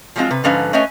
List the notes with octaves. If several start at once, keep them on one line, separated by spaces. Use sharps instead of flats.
F3 F#3 G#3 A#3 C4 F4
C3 B4
G#2 D3 F3 C#4 B4 F5
A3 C#4 B4 C#5 D#5 G#5